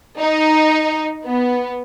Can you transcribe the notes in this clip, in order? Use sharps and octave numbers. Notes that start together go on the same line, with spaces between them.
D#4
B3